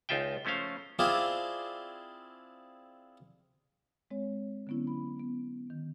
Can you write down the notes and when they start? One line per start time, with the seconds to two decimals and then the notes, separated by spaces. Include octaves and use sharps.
0.09 C#2 D#4 F4 E5 G5
0.45 F3 A3 C#4 C5 F5
0.99 C4 E4 F4 G#4 D5
4.11 G#3 C4 C#5
4.67 D3 F#3 B3 C#4 E4
4.87 B5
5.19 B3
5.70 D#3